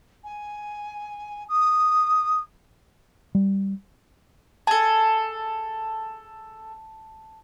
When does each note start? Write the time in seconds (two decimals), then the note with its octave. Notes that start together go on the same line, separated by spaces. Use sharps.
0.24 G#5
1.49 D#6
3.35 G3
4.67 G#4 A4 A5